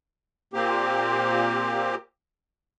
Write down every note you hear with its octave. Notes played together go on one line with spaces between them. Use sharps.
A#2 A#3 C4 G4